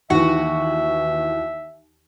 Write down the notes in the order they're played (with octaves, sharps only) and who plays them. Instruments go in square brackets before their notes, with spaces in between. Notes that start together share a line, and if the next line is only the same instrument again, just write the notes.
[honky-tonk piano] D#2 E3 [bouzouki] F#4 [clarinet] E5